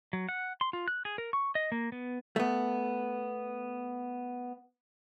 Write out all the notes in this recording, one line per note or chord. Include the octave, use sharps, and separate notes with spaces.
F#3
F#5
C6
F4
F#6
G#4
A#4
C#6
D#5
A#3
B3
A3 B3